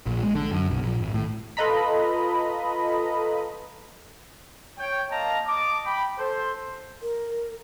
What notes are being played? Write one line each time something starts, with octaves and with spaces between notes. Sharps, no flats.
A#1
G#3
D3
F#2
B1
A#1
G#1
A2
F4 A4 B4 D#5 A#5 B5
C#5 G5
A#3 D#5 F5 A5 A#5
D#5 A5 D6
G5 B5
A4 C5
A#4